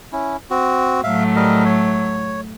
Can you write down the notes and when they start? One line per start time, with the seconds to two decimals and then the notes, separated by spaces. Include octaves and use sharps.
0.12 C#4 E4
0.50 C4 F#4
1.04 A2 F#3 A3 E5 F5
1.36 G3 A#4 D#5
1.66 C#5